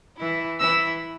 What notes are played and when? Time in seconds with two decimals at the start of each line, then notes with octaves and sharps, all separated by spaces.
0.19 E3 E4
0.60 E3 E4 E6